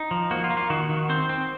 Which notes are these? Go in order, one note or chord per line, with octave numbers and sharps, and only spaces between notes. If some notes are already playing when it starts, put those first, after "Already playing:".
Already playing: D#4
F3
A#3 F#4
F4
A#3
F4
D#3 F#4
D#3
C4 C5
C4